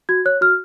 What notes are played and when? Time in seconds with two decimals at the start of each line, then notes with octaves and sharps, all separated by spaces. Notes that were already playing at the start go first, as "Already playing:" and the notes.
0.09 F#4 G#6
0.26 C#5 F#6
0.41 F#4 F6